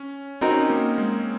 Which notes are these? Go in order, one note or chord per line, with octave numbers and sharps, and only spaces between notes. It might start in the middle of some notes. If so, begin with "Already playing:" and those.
Already playing: C#4
C4 D#4 F#4 A#4 D#5
C#4
C4
A#3
G#3